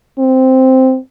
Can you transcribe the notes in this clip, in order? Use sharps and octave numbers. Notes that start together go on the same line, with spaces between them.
C4